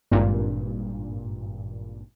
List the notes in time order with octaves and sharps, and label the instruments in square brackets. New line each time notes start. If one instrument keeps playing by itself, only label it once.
[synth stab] G#1 G2 A#2